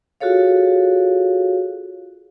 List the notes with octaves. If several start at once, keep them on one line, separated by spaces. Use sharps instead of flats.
F4 F#4 G#4 A4 C#5 F5